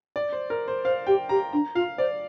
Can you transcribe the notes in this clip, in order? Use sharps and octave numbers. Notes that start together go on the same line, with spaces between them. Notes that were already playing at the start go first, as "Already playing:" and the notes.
D5
C5
A#4
C5
C5 F5
G4 G5
G4 A#5
D4 A#5
F4 F5
C5 D5